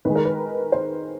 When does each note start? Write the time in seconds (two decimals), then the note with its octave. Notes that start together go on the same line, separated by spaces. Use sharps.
0.05 D#3 G#3 B4
0.15 A#4
0.25 B4
0.72 C5